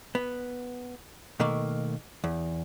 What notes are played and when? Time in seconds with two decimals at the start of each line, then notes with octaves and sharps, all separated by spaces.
0.15 B3
1.40 B2 D#3 A3 A#3
2.24 E2